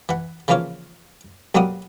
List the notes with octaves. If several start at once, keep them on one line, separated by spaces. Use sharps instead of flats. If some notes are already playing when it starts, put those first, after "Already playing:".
E3 F#5
C#3 E3 F3 A#3 F4 C#5
B1 F#3 G3 A#3 F#5 D#6